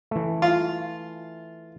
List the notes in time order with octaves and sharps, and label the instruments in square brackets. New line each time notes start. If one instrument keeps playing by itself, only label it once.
[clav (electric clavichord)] E3 A3
[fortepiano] F4